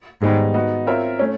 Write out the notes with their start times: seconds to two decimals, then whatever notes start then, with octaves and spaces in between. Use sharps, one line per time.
0.22 G#2 D#3 G3 B3 D#4 G#4
0.54 B3 D#4 F#4
0.87 C4 F4 A#4 C#5 E5
1.19 A3 C#4